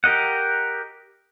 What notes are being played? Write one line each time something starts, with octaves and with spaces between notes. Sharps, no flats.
G4 A#4 D#5 F#5